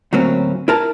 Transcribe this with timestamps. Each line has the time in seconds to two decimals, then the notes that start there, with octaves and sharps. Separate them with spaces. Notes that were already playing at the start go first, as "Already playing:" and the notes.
0.13 D2 A2 F#3 A#3 C4 C#4
0.68 E4 A#4 A5